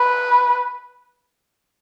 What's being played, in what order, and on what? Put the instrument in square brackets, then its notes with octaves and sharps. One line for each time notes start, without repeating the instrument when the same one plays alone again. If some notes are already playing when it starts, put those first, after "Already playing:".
Already playing: [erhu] B4